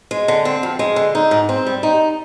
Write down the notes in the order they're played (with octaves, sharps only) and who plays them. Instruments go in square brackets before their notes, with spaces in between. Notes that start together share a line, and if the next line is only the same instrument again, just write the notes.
[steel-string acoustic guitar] G#3
D3
C4
F2
G#3
D3
D#4
G#2
C4
G3
D#4